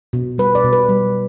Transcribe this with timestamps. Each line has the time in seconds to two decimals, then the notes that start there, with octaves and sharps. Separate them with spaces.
0.13 B2
0.38 G3 B4
0.55 D5
0.64 B2
0.73 B4
0.89 G3